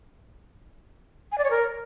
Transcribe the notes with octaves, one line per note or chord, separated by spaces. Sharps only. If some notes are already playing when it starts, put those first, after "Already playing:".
G#5
D5
C#5
A#4